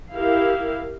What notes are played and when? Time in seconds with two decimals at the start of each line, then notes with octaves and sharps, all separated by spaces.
0.13 E4 G4 A#4 F5